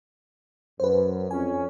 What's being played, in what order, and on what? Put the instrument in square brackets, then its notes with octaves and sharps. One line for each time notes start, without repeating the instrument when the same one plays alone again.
[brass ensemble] F#2 [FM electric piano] B4 C5
[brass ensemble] F2 C#4 [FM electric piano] G#5